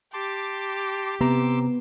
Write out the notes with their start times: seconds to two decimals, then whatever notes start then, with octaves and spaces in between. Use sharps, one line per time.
0.14 G4 A5 C6 D6
1.21 C3 B3 A#5 C6 D6 E6